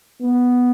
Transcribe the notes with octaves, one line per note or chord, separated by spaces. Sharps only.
B3